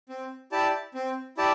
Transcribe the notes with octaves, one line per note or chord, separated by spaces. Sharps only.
C4
E4 G4 D5 A5
C4
E4 G4 D5 A5